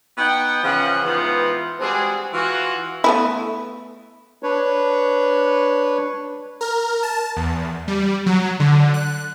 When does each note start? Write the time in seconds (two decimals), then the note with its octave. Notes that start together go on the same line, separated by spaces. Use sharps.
0.18 B3 D#4 F#5 G5
0.63 C#3 E3 F3 F#5
1.05 G#2 E3 B3 C4 F4
1.80 G3 G#3 C4 D4 F#4 G#4
2.33 E3 F4 F#4
3.04 A3 B3 E4
4.43 D4 B4 C#5
6.61 A#4
7.03 A5
7.37 E2
7.88 G3
8.26 F#3
8.60 D3
8.94 F#6